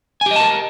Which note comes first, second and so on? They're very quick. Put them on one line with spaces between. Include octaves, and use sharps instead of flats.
G#5 G4 D#5 A5 A#4